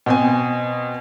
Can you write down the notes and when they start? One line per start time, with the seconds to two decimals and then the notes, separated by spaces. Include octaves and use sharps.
0.06 B2 C4 G#5